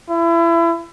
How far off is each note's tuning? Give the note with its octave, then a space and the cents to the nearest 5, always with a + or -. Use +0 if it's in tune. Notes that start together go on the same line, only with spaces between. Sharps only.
E4 +30